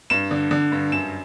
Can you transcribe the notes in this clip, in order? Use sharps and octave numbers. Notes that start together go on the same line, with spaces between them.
G2 E7
D3
D3
G2
F#2 E7